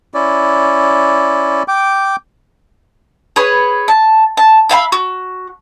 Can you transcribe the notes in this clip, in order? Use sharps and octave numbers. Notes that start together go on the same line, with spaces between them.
C#4 E4 D5
G5 D6
G#4 B4 C#5
A5
A5
E5 F5 G#5 B5
F#4